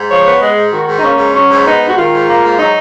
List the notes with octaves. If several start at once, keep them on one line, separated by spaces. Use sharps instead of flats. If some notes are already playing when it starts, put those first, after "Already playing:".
Already playing: G#2
F3 C#5
B3
G#3 G#4
G#2
D#3 F#4
G#2
D#4
A#3 C#4
G#2
F#3 C#4
G#2
B3 D#4
G#2
F#4
D#3 F4
G#2
A#3
G#2
F#3 D#4